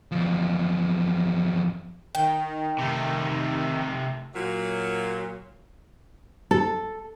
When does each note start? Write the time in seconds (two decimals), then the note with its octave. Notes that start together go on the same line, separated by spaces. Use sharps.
0.12 E2 F3
2.15 D#3 G5
2.79 C3 D#3 A3
4.35 A#2 F#3
6.51 A4